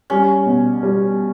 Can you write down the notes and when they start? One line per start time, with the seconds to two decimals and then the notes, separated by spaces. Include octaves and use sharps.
0.10 G3 C#4
0.46 B2
0.83 G3